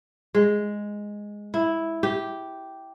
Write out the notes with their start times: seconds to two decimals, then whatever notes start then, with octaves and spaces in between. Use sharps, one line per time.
0.35 G#3
1.54 E4
2.03 G4